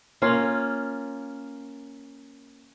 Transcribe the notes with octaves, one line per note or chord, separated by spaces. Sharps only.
A#3 C#4 F4